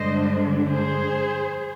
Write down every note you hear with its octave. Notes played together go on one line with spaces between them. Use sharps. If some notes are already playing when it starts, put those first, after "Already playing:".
Already playing: G2 D3 G#3 D4 C5 D#5
G#4 C5